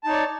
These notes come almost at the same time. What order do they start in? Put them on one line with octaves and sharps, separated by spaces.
A5 D#4 C#5 D5